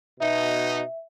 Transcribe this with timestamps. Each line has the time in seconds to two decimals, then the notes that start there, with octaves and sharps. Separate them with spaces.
0.20 B2 D#4 E5